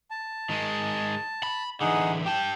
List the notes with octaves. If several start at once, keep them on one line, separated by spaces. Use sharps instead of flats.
A5
D#3 G#3
B5
D3 E3 D#4 G#4 F#5
G4 G5 A5